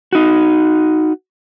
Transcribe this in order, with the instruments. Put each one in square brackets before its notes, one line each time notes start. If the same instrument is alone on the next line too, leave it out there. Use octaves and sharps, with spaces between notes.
[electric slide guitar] D#4 F#4